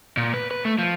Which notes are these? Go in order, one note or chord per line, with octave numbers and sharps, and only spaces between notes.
A#2
B4
B4
A3
F3